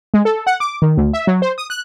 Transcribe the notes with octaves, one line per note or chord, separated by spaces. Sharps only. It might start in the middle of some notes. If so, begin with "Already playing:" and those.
G#3
A4
F#5
D6
D#3
D2
E5
F#3
C5
D#6
F#6